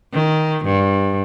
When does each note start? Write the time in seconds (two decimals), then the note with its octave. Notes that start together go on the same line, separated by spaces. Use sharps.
0.14 D#3
0.66 G2